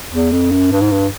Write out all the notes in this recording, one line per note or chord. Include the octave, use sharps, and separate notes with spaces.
E2
F2
F#2
G2
G#2
G2